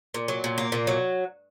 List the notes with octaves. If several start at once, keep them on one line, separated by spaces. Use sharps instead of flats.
A#2
F#3
A#2
A#3
A#2
F#3